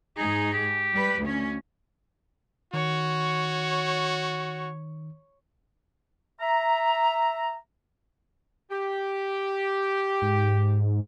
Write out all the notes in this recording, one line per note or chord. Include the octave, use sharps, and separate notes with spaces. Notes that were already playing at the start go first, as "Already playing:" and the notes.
G#2 D#4 G#4
G4
G3 B4
D2 C#4
D#3 F#4 C#5
E5 A#5
G4
G#2